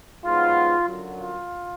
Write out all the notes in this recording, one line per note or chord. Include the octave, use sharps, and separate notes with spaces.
G#2 F#3 B3 F4
F#2 D3 F#3
F4